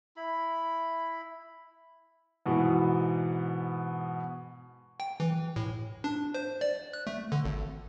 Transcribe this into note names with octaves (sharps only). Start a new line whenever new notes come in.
E4 B5
G#2 B2 E3 B3
G5
E3
A2
D4
C5
D5
F#6
A3
D3
G#1